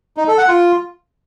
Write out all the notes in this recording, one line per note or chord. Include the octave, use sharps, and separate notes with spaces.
D#4
A4
F#5
F4